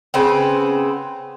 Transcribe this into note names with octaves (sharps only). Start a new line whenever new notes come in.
C#3 B3 C4